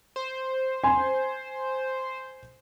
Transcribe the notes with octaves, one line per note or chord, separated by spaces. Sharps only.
C5
G#5 C6